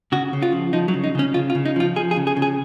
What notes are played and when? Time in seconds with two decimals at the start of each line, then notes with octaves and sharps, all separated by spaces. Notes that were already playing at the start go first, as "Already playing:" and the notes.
0.12 C#3 F#4
0.33 C#3
0.42 F4
0.52 F3
0.73 F3 D#4
0.88 F#3
0.94 C#3
1.04 D#4
1.15 C#3 C#4
1.34 C#3 F4
1.50 F4
1.55 C#3
1.65 D#4
1.76 F3 F4
1.96 F3 G#4
2.11 G#4
2.16 C#3
2.27 G#4
2.37 C#3
2.42 G#4